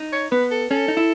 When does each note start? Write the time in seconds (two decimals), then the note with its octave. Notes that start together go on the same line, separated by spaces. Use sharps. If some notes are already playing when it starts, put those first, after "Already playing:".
Already playing: D#4
0.13 C#5
0.32 B3 B4
0.51 A4
0.71 C#4 A4
0.88 D#4
0.97 E4